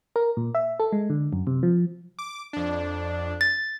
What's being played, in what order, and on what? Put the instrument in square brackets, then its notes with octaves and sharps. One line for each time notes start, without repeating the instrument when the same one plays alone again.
[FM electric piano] A#4
A#2
E5
A4
G#3
D3
F#2
C3
F3
[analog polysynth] D6
F2 D4
[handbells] A6